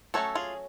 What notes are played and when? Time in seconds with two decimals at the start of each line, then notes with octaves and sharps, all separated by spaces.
0.14 F#3 A3 C#4 A4 C#5
0.35 F4 G#4